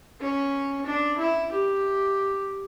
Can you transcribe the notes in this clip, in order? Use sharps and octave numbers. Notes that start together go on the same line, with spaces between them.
C#4
D4
E4
G4